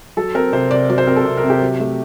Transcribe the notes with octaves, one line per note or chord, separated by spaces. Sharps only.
F#3 A4
C4 A#4
C3 C5
C3 D5
F#3 D5
C5
C4 A#4
A4
C3
A#4
C3
G4
F#3
A3